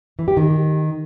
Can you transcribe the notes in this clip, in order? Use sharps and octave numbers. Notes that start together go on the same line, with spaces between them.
E3
G4
D#3